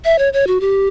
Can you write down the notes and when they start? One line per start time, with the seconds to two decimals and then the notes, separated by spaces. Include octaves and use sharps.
0.05 E5
0.19 C#5
0.33 C#5
0.47 F#4
0.61 G4